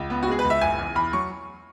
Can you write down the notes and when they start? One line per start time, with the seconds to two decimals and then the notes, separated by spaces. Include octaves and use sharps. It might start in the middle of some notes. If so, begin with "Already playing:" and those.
Already playing: C#2
0.10 B3
0.23 F#4
0.28 G#3 G#4
0.39 B4
0.45 C#2
0.50 E5
0.61 F#1 G#5
0.78 E2
0.95 E2 B5
1.13 F#3 C#6